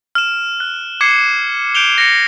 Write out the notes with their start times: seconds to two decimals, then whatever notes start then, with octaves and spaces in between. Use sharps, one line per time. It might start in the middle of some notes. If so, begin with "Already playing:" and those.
0.15 F6 E7
0.60 F#6
1.01 D6 G#6 C7 C#7 E7
1.75 G6 D7 F7 G7
1.98 A#6 C#7